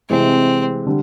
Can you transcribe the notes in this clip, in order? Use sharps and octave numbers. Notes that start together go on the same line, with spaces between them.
C3 E3 G#3 C4
D3 G3